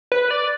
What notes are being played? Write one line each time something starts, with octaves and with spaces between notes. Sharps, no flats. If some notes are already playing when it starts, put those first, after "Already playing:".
B4
D5